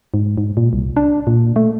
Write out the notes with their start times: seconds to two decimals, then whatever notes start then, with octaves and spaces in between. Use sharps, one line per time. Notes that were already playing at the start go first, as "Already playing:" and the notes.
0.14 G#2
0.38 G#2
0.57 A#2
0.73 C2
0.96 D4
1.27 A#2
1.56 A3